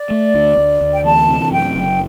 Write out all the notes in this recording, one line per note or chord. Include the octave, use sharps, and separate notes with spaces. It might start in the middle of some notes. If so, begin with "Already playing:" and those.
Already playing: D5
A3
D2
D2
D2
G5
E3 A5
C3
F#2 G5
F#1